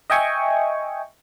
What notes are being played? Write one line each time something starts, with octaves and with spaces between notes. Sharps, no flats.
D#5 E5 G5 G#5 C#6